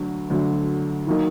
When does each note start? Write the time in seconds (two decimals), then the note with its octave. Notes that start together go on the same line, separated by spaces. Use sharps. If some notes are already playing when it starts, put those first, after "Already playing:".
Already playing: D2 D3 F#3
0.30 D2 D3 F#3
1.07 D#3 F#3 A#3 D#4